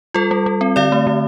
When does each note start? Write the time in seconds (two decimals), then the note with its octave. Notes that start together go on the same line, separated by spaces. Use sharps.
0.14 G3 F4 A4
0.31 G3
0.46 G3
0.61 C4
0.76 D3 D5 F5
0.92 A3
1.07 D3